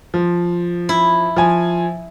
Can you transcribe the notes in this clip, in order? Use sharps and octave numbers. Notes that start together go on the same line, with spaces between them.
F3
E4
F3 G#5